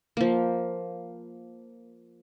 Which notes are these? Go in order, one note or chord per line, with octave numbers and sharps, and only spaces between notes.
F3 A#3